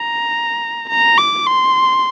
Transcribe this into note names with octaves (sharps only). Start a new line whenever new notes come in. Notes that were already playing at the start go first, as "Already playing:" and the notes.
Already playing: A#5
A#5
D6
C6